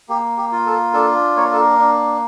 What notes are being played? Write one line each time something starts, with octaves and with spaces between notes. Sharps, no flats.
A#3 G4
G4
F4
A4
D4 A4
A#3 C#5
A#4
A4
A#4
D4